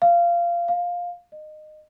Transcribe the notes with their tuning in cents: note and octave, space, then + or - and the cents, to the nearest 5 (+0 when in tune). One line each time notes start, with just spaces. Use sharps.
F5 -20
F5 +10
D#5 -20